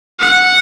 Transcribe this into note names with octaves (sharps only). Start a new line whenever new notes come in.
F#5